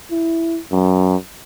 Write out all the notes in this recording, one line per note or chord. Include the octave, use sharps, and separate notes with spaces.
E4
F#2